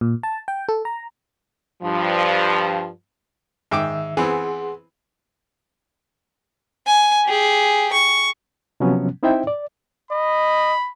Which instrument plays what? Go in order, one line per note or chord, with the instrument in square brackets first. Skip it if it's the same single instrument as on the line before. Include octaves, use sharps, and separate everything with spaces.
[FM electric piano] A#2
A5
G5
A4
A#5
[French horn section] G2 F3
[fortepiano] G#2 G5 D6 [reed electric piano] D#3 E5 E6
[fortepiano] E3 B3 C4 [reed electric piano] G#4 F#5 C6
[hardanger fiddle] G#5
G4 G#4
C#6
[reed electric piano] C3 F3 F#3 B3 C#4
C4 D#4 E4 C5 E5 G5
D5
[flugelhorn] D#5 [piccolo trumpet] B5